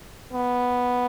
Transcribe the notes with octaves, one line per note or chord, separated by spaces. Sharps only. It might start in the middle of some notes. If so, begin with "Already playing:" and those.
B3